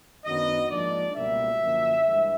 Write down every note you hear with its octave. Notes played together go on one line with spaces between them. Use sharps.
F#2 D#3 F#3 B3 D4 D#5
G#2 F3 A#3 D4 D5
C#2 B2 G3 A#3 E5
F#2 D3 F3 A#3
G2 E3 G#3